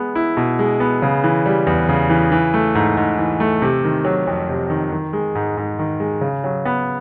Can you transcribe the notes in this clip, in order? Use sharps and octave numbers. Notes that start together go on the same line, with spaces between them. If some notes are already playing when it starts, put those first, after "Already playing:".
Already playing: G#3 B3
E4
B2
G#3
B3
C#3
E3
G3
E2
C#3
E3
E3
A3
G#2
G#2
E3
A3
C3
D#3
F#3
F2
C3
D#3
D#3
G#3
G#2
G#2
D#3
G#3
C#3
F#3
B3